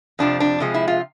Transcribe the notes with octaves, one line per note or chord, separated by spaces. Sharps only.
F2 C3 F3 D4
D4
C3 F3 G#3
E4
F4